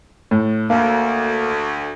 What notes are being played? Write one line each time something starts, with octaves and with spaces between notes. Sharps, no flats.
A2
D2 A#3